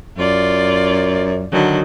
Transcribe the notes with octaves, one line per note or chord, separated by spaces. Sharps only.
F#2 F4 D5
D3 D#3 F#3